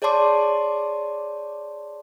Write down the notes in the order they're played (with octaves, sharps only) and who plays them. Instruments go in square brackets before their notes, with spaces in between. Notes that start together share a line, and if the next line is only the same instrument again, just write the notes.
[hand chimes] G#4 C#5 D5 A5 C6 D6